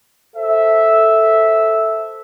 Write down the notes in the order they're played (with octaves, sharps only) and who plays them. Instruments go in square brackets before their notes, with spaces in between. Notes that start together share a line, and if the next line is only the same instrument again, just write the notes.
[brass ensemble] A4 C5 E5